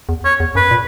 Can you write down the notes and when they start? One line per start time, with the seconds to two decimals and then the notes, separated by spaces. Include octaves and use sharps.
0.09 E2
0.24 C#5
0.40 E2
0.55 F#2 B4
0.71 A#2